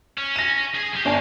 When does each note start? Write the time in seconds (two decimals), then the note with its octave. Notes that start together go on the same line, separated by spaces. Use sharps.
0.18 C#4
0.36 A#6 D#7
0.75 G#4 G#5
0.91 B1 G4
1.05 G1 A#3 D4 G#5